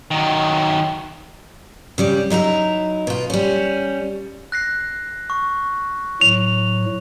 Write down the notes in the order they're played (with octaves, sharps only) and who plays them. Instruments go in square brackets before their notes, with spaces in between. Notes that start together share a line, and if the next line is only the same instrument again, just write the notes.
[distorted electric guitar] D#3 F#3
[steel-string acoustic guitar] C#3 G3 D5
F#3 D#4 E4 A#5
B2 F4
G3 C#4
[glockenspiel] F#6 A#6 C7
C#6
[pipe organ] A2 F#3 [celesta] F7